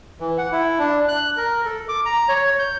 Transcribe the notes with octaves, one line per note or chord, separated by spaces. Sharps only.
E3
F#5
E4
D4
F#6
A#4
A4
D6
A#5
C#5
G6